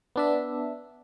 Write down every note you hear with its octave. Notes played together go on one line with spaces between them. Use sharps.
B3 D4 E5